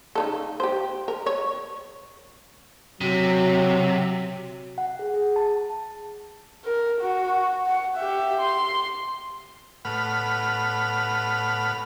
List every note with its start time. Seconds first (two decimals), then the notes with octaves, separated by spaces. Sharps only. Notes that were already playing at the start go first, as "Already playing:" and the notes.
0.15 C#3 D#4 A4
0.60 G4 C5
1.08 A#4
1.26 C#5
3.01 C3 F#3
4.78 F#5
4.99 G#4
5.14 G#4
5.36 A5
6.65 A#4
7.01 F#4
7.66 F#5
7.96 G4 E5
8.40 C6
9.85 A2 B4 F#5 B5 F6